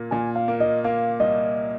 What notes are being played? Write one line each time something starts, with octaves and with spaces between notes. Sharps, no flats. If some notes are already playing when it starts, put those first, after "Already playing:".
Already playing: A#2 A#3
A#2 G#5
F5
A#3
D#5
A#3 F5
C2 D#5